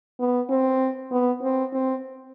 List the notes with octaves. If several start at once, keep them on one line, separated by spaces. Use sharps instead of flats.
B3
C4
B3
C4
C4